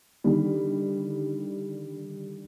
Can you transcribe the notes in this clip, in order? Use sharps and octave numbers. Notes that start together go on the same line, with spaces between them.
D3 D#3 G3